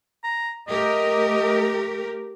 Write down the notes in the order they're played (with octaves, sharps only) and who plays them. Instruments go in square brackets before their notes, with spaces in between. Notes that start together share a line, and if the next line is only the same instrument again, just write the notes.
[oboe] A#5
[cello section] A3 G4 A#4 [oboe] D#5